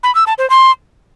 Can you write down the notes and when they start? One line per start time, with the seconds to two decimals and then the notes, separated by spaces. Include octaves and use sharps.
0.03 B5
0.15 E6
0.27 A5
0.38 C5
0.50 C6